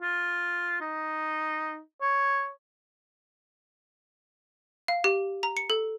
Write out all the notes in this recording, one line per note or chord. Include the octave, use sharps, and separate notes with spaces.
F4
D#4
C#5
F5
G4
A#5
C#7
A4